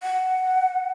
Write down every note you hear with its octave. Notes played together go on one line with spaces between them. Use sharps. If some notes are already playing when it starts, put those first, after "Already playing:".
F#5